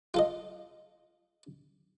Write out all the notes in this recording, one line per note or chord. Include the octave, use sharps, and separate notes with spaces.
F4 A4 D#5